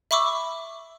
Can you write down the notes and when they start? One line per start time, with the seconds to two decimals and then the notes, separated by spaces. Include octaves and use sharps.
0.11 E5 B5 C#6 D6 E6